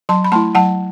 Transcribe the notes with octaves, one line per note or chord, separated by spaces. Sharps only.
F#3 A5 C6
B5
A3 E4 A5 C6
F#3 F#5 A5